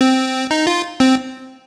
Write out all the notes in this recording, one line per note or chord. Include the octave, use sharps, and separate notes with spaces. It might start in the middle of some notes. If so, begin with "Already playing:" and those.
C4
D#4
F4
C4